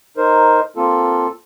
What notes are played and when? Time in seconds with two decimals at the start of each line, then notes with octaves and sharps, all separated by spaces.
0.17 D#4 A#4 C5
0.77 A#3 C4 F4 A4